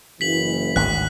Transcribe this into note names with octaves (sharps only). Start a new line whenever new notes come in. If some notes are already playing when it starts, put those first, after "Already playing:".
F#1 E3 B6 F#7
G#1 D2 A2 F#6 B6